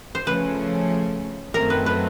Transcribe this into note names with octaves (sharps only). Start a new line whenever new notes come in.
C5
C#3 F3 A3 C#4 B4
F#2 D#3 F#3 A3 C4 A#4
B4
B4